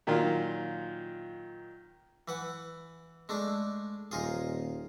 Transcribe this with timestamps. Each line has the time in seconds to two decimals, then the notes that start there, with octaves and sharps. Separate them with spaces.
0.07 A#2 D#3 F#3 F4
2.28 E3 B4 F#5
3.29 G#3 A3 D4
4.11 D#1 D#4 F4 G#4